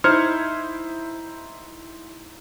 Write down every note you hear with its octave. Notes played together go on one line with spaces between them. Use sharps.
D#4 E4 C5 F6 G#6 C#7